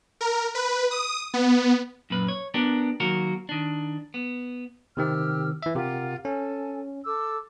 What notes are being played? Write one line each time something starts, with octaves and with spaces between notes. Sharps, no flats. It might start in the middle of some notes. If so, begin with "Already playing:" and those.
A#4
B4
D#6
B3
F#2 A#2 B4
C#5
B3 D4 G4 A#4
D#3 F#3 A#3 F#4 A#4
D#3 D4
B3
C3 D#3 C4 G4 E6 F6
E3 E5
C3 F4 G4 A#4 F#5
C#4 A4 G#5
A4 D6 E6